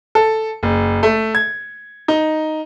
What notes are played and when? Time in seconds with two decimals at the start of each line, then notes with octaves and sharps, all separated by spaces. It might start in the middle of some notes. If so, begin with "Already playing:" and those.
0.15 A4
0.63 F#1
1.03 A3
1.35 G#6
2.08 D#4